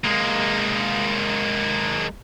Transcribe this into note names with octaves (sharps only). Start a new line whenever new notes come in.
G#3 A#3